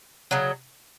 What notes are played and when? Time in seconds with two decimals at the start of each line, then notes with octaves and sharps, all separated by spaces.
0.31 C#3 F#3